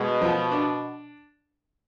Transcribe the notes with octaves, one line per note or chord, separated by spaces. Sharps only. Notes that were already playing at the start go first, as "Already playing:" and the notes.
Already playing: B2 G#3
F3
D4